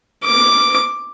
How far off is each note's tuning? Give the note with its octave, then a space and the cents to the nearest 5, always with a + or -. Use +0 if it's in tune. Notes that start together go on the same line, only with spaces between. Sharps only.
D6 +5